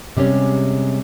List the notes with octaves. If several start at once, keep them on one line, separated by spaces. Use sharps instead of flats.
C3 G3 G#3 C#4